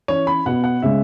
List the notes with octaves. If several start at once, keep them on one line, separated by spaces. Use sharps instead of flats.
E3 C#4 E4 C#5
B5
B2 B3 F#4 F#5
F#5
C#3 G#3 E5